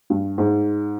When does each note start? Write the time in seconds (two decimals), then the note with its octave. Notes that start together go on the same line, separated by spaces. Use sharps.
0.10 G2
0.38 G#2